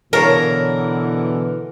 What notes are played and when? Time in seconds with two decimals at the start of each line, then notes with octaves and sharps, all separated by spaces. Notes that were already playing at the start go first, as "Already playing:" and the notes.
0.13 B2 D3 E3 A#4 C#5 F5 A5